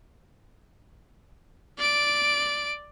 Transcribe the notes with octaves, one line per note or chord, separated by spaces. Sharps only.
D5 D7